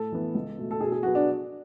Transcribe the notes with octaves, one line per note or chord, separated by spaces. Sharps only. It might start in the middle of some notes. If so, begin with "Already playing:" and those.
Already playing: A2 A4
E3 B3
C#2
B2 A3
A4
B2 G#4
G#4
F#3 B3 F#4
D4